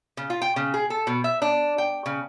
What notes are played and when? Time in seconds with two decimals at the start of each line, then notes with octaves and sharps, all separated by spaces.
0.17 C#3
0.30 F4
0.42 G5
0.56 C#3
0.74 G#4
0.90 A4
1.07 B2
1.24 E5
1.42 D4
1.78 G5
2.06 C#3